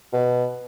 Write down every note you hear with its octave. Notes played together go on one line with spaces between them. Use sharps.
B2